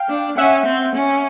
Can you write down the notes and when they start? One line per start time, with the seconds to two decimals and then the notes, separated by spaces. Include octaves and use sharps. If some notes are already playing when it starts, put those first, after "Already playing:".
Already playing: F5 G5
0.09 D4
0.37 C#4 E5 F#5
0.66 C4
0.95 C#4